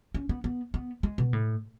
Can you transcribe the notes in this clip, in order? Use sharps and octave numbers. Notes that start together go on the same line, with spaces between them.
C#4
B3
B3
B3
G#3
B2
A2